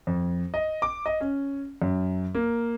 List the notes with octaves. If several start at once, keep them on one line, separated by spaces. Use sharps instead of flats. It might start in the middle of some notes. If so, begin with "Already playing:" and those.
F2
D#5
D6
D#5
C#4
F#2
A#3